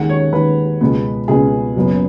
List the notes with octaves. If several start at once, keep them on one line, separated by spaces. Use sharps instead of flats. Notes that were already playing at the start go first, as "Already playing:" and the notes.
Already playing: D#2 D#3 G#3 F#5
C#5
D#2 D#3 G#3 B4
C#2 B2 G#3 B3
C#2 B2 G#3 B3 G#4
F#1 F#2 F#3 B3